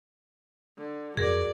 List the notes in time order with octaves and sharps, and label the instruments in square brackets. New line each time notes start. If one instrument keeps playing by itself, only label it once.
[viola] D3
[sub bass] F2 [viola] F#3 D5 [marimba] G#4 A#4